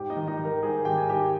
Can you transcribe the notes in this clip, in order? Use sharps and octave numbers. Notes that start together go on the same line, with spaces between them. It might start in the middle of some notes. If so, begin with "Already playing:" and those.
Already playing: G#2 G4 G5
D#4 D#5
D#3
D#4 D#5
D#3
A#4
G#2 G#4
D#3 G4 G5
G#5
G#2 G4 G5